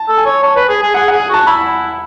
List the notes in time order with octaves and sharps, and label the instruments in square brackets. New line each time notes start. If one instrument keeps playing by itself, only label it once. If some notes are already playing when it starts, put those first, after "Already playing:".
Already playing: [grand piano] A5
[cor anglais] A4
[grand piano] G#5
[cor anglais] C#5
[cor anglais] C#5 [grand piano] A5
[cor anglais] B4
G#4
G#4
[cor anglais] G#4 [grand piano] F#5
[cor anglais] G#4 [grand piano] F#5
[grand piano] G#5
[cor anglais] F#4 [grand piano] A5
[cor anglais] E4 [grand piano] B5